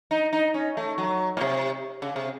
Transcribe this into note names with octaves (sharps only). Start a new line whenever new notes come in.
D#4
D#4
C#4
A3
F#3
A2
C3
C#3
C3